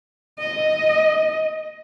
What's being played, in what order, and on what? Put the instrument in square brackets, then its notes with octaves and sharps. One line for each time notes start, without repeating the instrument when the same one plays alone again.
[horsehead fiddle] D#5